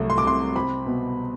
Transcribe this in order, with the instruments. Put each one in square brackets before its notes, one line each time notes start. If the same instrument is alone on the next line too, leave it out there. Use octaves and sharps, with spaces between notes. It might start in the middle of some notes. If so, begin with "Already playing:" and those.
Already playing: [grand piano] C2 F#3 A3
C6
D6
C3 C6
C4 B5
B2